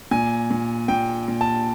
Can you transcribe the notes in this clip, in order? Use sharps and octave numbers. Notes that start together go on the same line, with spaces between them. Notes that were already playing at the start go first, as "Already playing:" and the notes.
A#2 G#5
A#2
A#2 G5
A#2
A5